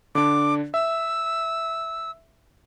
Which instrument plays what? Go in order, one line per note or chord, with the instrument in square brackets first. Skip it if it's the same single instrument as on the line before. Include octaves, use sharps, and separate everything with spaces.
[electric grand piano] D3 D4 [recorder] D6
[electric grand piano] E5 [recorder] E6